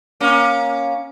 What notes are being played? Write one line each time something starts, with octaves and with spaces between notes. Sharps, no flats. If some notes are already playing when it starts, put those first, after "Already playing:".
A#3 C#4